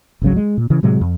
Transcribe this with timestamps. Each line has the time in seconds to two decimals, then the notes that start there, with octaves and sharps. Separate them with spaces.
0.22 G#1 C#2 C#3 F#3
0.36 G#3
0.57 A#2
0.70 C#3 E3
0.83 A2 C3 F#3 G#3
1.01 F2